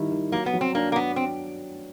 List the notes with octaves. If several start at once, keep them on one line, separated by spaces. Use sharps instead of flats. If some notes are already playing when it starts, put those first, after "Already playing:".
Already playing: D#3 G3 E4
D#3
F#3 A#3
B3
F#3
C4
A#3 D4
A#3
B3 D4
C4